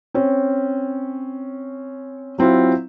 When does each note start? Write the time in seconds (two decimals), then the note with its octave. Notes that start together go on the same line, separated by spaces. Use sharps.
0.14 C4 C#4
2.38 F#3 C4 E4 F4